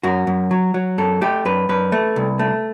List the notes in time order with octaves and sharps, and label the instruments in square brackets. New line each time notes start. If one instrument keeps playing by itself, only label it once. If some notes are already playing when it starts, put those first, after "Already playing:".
[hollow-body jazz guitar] F#2 F#4
F#2
F#3
F#3
F#2 A4
A3 G4
F#2 B4
F#2 B4
A3
C2
A3